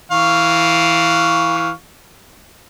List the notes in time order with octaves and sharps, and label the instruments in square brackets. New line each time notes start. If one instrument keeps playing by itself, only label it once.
[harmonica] E3 F5 C#6